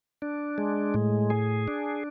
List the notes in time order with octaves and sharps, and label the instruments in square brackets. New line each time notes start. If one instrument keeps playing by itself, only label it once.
[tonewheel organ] D4
G#3
A2
G#4
D4